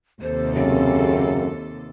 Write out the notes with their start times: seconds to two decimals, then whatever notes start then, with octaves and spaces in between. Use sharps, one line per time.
0.21 D#2 C3 A4 C5
0.55 F#2 C#3 C4